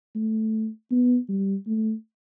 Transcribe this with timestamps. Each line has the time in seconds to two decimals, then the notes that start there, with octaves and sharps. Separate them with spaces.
0.15 A3
0.91 B3
1.29 G3
1.67 A3